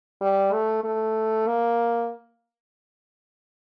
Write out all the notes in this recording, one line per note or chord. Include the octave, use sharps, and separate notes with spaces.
G3
A3
A3
A#3